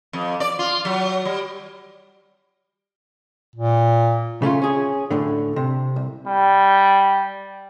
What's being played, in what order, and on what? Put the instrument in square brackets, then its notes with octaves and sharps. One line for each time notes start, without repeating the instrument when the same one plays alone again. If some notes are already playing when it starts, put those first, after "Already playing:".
[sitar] F2
D5
F4
F#3
G3
[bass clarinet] A#2
[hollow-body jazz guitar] C#3 A3 C#4 F4
C#4 G#4
D2 A2 D3
C3
C2
[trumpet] G3